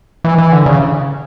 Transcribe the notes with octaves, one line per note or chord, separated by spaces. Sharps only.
E3
E3
D3
C#3